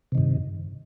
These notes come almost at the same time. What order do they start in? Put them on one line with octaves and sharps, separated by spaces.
C3 D#3 G2